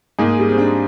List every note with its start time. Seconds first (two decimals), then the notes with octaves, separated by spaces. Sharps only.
0.19 G#2 A#3 D#4 G#4
0.39 G3
0.49 C4
0.58 D4